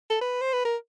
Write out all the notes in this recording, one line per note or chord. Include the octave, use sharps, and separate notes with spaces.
A4
B4
C5
B4
A#4